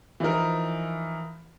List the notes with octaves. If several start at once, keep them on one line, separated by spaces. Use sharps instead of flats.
E3 F3 D#4 A#4